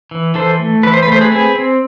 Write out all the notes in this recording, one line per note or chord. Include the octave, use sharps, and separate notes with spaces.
E3
E3 A4 C5
A3
E3 B4
C5
B4
A3 C5
G#4 B4
C4 G#4 B4
C4